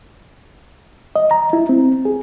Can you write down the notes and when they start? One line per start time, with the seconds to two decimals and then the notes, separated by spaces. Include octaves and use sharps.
1.16 D#5
1.31 A#5
1.53 E4
1.69 C4
2.05 G#4